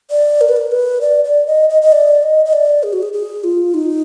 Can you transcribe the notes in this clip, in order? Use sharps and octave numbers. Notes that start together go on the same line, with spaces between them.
D5
A#4
B4
A#4
B4
D5
D5
D#5
D#5
D#5
D5
D#5
D#5
D5
G#4
F#4
G#4
G#4
F4
D#4